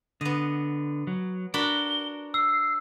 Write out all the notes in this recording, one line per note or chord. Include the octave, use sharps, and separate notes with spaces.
D3 B3 D#5
F#3
D4 F#4 A#4 B5 G7
E6 C7